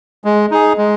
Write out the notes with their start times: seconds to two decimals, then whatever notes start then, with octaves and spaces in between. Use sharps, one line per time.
0.24 G#3
0.51 D#4 G#4
0.78 G#3